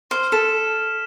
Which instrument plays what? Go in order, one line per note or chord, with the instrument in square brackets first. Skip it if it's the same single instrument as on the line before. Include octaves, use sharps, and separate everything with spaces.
[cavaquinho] C5 [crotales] F6
[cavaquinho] A4 [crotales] B6 E7